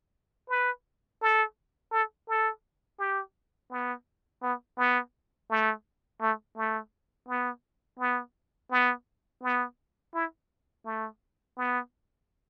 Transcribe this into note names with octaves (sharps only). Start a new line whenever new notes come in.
B4
A4
A4
A4
G4
B3
B3
B3
A3
A3
A3
B3
B3
B3
B3
E4
A3
B3